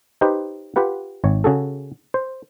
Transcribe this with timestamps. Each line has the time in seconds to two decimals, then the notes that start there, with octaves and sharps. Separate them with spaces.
0.21 D#4 G4 B4 C5
0.76 F4 G4 B4 F#5
1.24 G#1 C#5
1.44 C#3 F#4 G#4 A4
2.14 C5